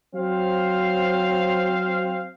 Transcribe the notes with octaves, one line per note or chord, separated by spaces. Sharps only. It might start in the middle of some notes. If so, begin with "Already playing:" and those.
F#3 C4 C5 F5